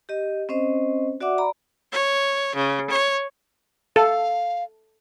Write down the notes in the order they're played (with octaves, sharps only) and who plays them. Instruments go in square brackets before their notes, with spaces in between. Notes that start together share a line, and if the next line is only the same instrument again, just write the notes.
[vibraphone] G4 D#5
C4 C#4 C5 D#5
F#4 D5 E5 F#5 D6
D5 A#5 B5
[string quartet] C#5
C#3
C#5
[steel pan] A4 [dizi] F5